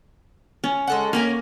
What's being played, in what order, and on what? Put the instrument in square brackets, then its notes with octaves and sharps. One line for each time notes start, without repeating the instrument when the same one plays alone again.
[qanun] C#4
[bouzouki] G#3 A4 F#5
[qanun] A#3 [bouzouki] C#4 A#4 G#5